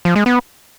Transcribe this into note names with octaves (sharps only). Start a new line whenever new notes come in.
F3
G#3
B3